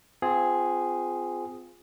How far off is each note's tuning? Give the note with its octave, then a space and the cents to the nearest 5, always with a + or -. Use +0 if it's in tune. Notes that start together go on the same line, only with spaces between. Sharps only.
C4 -25 F4 +0 G#4 +0